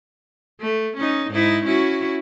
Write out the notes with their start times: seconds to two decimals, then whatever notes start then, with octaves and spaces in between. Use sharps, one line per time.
0.61 A3
0.97 C#4 D#4
1.31 G#2 D#4 E4
1.64 C#4 E4 F#4